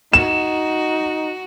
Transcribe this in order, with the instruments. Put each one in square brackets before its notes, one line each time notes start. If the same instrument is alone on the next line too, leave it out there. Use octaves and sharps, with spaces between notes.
[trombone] D#4 [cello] F#4 [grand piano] E7